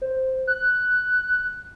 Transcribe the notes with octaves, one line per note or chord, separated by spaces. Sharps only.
C5
F#6